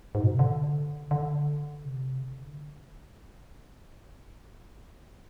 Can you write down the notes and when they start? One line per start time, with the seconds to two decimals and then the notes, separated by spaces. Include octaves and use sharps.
0.15 G#2
0.24 B2
0.31 C3
0.39 D3
1.11 D3
1.85 C3
2.20 D3